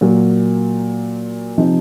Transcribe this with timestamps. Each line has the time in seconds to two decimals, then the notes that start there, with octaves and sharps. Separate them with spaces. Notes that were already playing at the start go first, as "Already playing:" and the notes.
0.01 A#2 F#3 A#3
1.58 C3 F3 C4 D#4